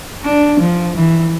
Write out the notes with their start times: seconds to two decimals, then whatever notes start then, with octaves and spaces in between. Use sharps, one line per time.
0.24 D4
0.60 F3
0.96 E3